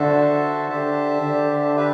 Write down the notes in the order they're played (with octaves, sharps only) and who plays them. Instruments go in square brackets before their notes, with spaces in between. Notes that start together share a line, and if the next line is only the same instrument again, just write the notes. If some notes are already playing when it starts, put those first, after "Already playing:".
Already playing: [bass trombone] D3 [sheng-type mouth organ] F#4 A4 C5 E5 A5
[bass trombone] D3 [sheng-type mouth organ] G4 C5 E5 A5
[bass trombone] D3
[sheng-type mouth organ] D4 G4 B4 E5